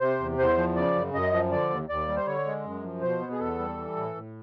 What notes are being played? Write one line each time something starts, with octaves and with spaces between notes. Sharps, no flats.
C3 C5
E2
E2 C5
F3
C#3 D5
F#2
F#2 D#5
F3
D3 D5
D#2
D#2 D5
G3
C5
D3 C#5
G#3
F#2
F3
B2 C5
B3
G#4
E2 A4
G3
E3
A2
A2